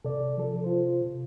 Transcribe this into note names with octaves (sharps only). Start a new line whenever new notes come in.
C3 A4 D5
F3 A4
F4 C5